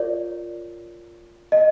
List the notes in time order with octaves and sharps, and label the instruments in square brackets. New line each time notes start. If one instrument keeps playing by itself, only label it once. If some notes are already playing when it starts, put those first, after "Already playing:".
Already playing: [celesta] F4 A#4 C#5 D5
D#5